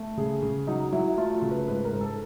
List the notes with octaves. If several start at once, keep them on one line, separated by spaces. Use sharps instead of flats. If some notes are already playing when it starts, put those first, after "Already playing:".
Already playing: A3
C#3 G#4
C#3
F#3 D#4
F#3 E4
A3 F4
F4
C#3
B4
G#2 B4
A#4
G#2
A4